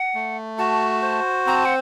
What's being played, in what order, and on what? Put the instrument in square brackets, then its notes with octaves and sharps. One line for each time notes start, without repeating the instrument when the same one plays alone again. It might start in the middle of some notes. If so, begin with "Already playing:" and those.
Already playing: [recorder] F#5
[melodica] A3
[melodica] F#4 [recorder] A5
[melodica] C5
[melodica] C4 [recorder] A#5
[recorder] A5
F#5